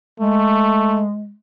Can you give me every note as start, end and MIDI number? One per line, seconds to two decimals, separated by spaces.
0.20 1.35 56
0.20 1.04 57